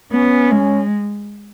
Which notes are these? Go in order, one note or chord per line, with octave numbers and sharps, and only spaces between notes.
B3 C#4
G#3